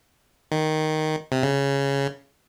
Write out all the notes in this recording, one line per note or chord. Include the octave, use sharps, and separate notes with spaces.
D#3
C3
C#3